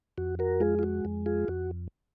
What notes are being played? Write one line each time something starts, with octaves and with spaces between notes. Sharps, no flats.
F2 F#4
F#4 A#4
G#3 F4 G#4
F4
F#4
F2
F4 G#4
F2 F#4